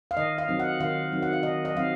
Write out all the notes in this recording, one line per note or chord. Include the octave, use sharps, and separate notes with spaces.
F5
D#3 D#5
F5
F#3 C4 D#4
F#5
D#3 F5
F#3 C4 D#4
F#5
F5
D#3 D#5
D#5
F#3 C4 D#4 F5